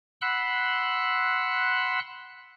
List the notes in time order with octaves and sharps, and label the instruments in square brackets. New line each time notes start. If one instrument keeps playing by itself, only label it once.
[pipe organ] F#5 B5 C6 E6 F#6